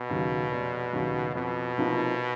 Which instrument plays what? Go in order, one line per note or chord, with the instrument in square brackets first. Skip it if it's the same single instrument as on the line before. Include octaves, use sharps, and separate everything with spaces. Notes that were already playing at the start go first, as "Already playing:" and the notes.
Already playing: [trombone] B2
[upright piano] D#2 C#3 F#3
F1
D#2 C#3 F#3
[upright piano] F2 [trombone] B2
[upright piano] C3 F3 A#3 D#4